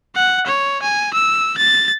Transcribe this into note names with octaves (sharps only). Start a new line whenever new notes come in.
F#5
C#5
G#5
E6
A6